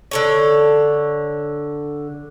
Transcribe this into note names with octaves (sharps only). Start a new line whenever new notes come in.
D3 A4 C#5